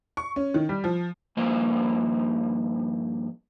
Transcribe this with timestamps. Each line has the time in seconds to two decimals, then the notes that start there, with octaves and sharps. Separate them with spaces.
0.17 C#6
0.36 C#4
0.54 D#3
0.69 G3
0.84 F3
1.37 G2 F3 A#3 C5 D#5